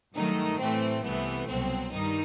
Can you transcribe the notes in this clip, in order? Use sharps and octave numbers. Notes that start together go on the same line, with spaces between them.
G2 D#3 F#3 A3 D#4
A2 E3 A3 C4
C2 C3 E3 A3 B3
C2 B2 F#3 C4
G2 D#3 G3 D#4